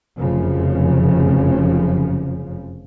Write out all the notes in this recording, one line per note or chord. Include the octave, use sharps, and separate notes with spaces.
F1 F#2 C#3 F3